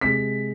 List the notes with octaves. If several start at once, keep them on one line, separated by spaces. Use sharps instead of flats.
C3 G#3 B6